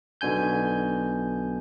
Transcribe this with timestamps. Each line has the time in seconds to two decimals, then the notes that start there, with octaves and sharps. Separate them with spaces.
0.21 B1 B2 D3 G#5 G6